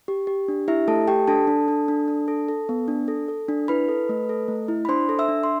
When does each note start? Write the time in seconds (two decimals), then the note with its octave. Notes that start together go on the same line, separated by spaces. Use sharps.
0.08 G4
0.27 G4
0.48 D4
0.68 E4 G4 E5
0.88 A3 A4 A5
1.08 G4 G5
1.28 D4 A4 A5
1.47 D4
1.68 D4
1.88 D4
2.08 D4
2.28 A4
2.48 A4
2.69 B3
2.88 D4
3.08 A4
3.28 A4
3.49 D4
3.68 E4 B4 B5
3.88 A4
4.09 A3
4.29 A4
4.48 A3
4.68 E4
4.85 B5
4.89 D4 C5 C6
5.09 A4
5.19 E5 E6
5.28 D4
5.44 C6